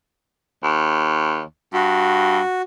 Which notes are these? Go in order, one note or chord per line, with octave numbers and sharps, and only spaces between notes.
D#2
G2 F#4